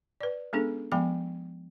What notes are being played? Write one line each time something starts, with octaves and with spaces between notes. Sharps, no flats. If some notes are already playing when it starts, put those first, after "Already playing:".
B4 D5
G#3 B3 C#4 D4 G#4 A4
F3 G#3 B3 G5 B5